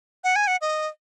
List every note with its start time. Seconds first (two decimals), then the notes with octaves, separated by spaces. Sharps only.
0.24 F#5
0.36 G#5
0.47 F#5
0.61 D#5